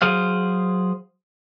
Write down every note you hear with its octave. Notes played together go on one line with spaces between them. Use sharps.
F#3 G#4 C5 F5